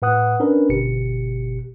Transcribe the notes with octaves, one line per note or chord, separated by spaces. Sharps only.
A2 B4 F#5 D#6 F#6
C#4 D4 A#4 B4
G1 B2 G4 C#7